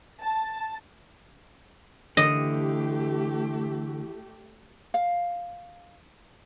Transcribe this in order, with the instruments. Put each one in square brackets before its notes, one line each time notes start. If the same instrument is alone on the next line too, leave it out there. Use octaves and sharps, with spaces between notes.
[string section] A5
[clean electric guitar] D3 [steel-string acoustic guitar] E3 E4 [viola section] A3 G4 [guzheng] D#5
[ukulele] F5